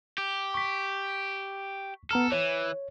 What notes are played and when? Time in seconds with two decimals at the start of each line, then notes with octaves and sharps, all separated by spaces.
0.18 G4
0.54 C#6 B6
2.11 B3 A4 A#5 F6
2.32 E3 C#5